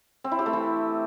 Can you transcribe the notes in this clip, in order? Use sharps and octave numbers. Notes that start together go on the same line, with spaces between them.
C4
E4
G4
A3
E3